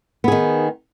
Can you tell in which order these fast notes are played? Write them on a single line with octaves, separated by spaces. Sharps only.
B3 G#4 D#3